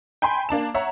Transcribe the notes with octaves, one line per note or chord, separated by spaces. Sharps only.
G5 G#5 B5 C6
A#3 D4 A5 E7
C#5 E5 F#5 A#5